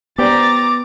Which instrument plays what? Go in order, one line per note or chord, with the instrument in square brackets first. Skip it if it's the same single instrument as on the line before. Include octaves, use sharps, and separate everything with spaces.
[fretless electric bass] B3 [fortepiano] G4 C5 D5 [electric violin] A#5 A6 [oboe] D6